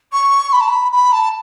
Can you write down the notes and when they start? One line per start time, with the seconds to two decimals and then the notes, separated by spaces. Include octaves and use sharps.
0.12 C#6
0.52 B5
0.60 A5
0.68 B5
0.92 B5
1.12 A5